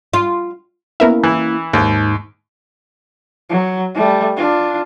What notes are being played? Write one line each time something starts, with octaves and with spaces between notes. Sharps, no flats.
F4
A#3 B3 C#4 E4 A#4 E5
E3
D#2 G#2
F#3
G3 A3
D4 F4